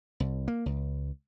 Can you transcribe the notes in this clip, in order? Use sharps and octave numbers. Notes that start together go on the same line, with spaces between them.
C2
A#3
C#2